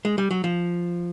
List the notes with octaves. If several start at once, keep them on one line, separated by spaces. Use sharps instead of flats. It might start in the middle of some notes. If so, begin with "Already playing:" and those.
G#3
G3
F#3
F3